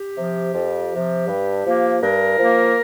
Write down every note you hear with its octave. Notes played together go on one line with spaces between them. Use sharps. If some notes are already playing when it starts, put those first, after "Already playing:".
Already playing: G4
C3 F3
F2
C3 F3
G2
F3 A#3
G2 A#4
F3 A#3